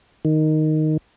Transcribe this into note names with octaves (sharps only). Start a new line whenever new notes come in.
D#3